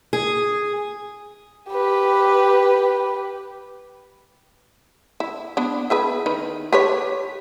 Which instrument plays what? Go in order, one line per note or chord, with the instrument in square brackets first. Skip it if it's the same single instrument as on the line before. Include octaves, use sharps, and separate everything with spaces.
[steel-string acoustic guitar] G#4
[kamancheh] G4 B4
[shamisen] E4
B3 D4
E4 G#4 B4
D#3 D#4 B4
G4 B4 C#5